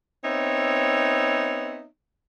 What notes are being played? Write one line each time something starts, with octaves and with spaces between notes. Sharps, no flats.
B3 C4 D#4 C#5 E5